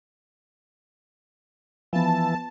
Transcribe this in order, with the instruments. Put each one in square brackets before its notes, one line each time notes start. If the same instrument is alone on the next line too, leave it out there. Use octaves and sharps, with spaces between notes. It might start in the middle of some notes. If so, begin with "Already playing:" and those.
[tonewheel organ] E3 [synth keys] F3 B3 [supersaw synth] A5